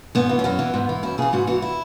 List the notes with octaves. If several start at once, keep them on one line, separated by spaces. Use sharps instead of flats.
G#2 B3
E3
C#4
F#2 B3
E3
G#2
E3
F#2 E4
C#3 E3 G#4
G#2 F#4
E3 F#4
E4